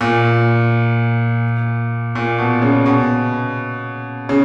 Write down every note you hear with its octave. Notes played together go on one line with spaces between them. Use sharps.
A#2
A#2
B2
C#3
B2
C#3